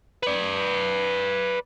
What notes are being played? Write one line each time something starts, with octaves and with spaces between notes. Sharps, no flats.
B4 D5